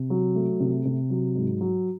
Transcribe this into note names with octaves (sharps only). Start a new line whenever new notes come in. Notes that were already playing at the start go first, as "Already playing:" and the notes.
Already playing: C3
F#3
A3
C3
C3
F#3
G#2
F#3